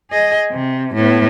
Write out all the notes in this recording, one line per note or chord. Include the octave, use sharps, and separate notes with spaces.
G#4 D#5
C3
A2 B3